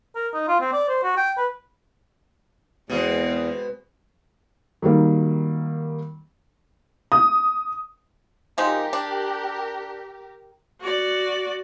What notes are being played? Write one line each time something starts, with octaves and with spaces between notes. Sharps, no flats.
A#4
D#4
F4
C4
D5
C5
F#4
G5
B4
E2 B2 G#3 C4
D#3 F#3 G3 A#3
D#6
F3 G#3 D#4 G4 A#4
D4
F#4 D5